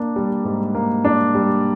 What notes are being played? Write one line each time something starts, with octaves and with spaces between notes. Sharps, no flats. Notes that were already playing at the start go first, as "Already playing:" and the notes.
Already playing: A#3 D4
G3
G#2
A#3
D4
G3